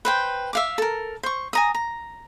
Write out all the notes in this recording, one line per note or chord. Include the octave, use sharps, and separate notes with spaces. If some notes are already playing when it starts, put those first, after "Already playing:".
B4 C5 G5
E5 F5 D6
A4 A#4
C5 C#6
G#5 A#5 D#6
A#5